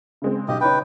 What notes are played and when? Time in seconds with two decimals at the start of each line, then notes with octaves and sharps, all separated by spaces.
0.22 C#3 G#3 C4
0.48 B1 G4 D#5
0.61 C#3 D#4 B4 C#5 G5